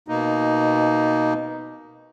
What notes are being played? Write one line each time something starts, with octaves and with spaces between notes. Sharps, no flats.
B2 A#3 D#4